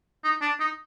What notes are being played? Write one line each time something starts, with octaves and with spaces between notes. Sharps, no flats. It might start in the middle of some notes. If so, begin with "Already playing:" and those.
D#4
D4
D#4